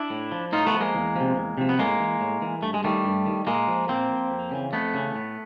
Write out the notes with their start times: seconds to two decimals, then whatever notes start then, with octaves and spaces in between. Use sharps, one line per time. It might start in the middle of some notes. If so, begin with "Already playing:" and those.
Already playing: D4 E4
0.10 A2
0.32 F3
0.52 A2 D#4 F4
0.66 A3 B3
0.74 F3
0.80 G#3 A#3
0.95 E2
1.16 C3 F3
1.37 E2
1.58 C3 F3
1.69 B3
1.79 A2 G#3 A#3
2.00 E3
2.21 A2
2.42 E3
2.63 G2 A3
2.74 G#3
2.84 D#3 G3 A3
3.05 G2
3.26 D#3
3.46 A#2 G#3 A#3
3.68 F3
3.89 A#2 A#3 C4
4.10 F3
4.31 F2
4.51 C#3 E3
4.73 F2 A3 B3
4.94 C#3 E3
5.15 A2